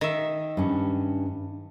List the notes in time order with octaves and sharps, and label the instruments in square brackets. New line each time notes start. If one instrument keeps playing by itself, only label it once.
[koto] D#3 E5
[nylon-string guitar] G2 C#4